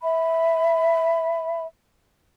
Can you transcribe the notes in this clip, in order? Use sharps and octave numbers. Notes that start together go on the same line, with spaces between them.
E5 B5